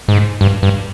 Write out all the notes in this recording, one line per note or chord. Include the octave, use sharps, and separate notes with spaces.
G#2
G2
G2